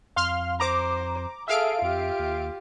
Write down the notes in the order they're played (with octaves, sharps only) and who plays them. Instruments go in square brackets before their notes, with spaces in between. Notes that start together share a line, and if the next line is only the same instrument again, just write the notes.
[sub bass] F2 [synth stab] F5 C6 F6
[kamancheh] C5 [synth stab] A#5 D6
[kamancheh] G#4 A4 [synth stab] E5 F5 D7
[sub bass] F2 [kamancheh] F4 G4
[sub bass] D#2